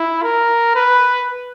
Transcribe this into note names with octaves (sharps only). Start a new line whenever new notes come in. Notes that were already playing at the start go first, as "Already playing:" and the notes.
Already playing: E4
A#4
B4